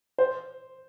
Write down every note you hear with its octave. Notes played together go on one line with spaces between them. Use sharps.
C5